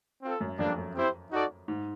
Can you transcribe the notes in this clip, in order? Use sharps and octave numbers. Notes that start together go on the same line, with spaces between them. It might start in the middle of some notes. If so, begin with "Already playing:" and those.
C4 F4 A4
F#2
F2 G3 A#3 D4
F#2
C4 E4 G4 C5
D#4 F#4 A4 D5
G#2